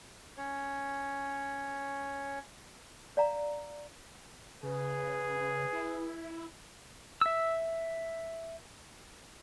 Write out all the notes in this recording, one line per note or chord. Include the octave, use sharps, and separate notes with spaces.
C#4 C#5
D5 F5 A#5
C#3 G#4 B4
E4
E5 E6